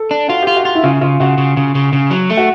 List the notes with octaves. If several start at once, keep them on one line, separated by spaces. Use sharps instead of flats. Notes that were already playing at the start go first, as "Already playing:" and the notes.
Already playing: A4
D4
F4 F#4
F4 G4
F#4
F4
E4
C#3 F4
C#3 F4
C#3 F#4
C#3
C#3
C#3
C#3
F#3
A3
F#4